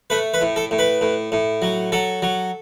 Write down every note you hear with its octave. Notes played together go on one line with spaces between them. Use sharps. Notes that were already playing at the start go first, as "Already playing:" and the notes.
A3 B4
B4
A2
A4
A2
B4
A2
A2
F#3
F#3 A4
F#3